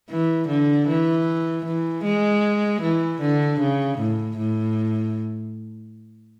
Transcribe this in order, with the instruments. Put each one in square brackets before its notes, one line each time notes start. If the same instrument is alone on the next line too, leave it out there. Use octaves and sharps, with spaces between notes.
[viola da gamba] E3
D3
E3
E3
G#3
E3
D3
C#3
A2
A2